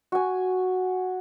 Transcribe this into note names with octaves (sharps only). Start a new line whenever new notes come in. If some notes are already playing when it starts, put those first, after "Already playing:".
F#4 G#5